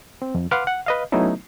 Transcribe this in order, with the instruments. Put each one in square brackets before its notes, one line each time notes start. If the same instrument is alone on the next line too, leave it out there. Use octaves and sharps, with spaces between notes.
[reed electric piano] C4
F2
B4 F5 F#5 C6 D6 F6
F#5
B4 D#5 F5
F#3 A3 B3 C#4 D#4 E4